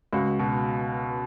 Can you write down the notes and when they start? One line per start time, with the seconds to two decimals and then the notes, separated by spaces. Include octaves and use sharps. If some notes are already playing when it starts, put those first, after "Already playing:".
0.13 C#2 F#4
0.39 B2